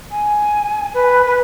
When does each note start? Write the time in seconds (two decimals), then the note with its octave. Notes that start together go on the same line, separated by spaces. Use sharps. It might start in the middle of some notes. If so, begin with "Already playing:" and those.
0.11 G#5
0.94 B4
1.26 B4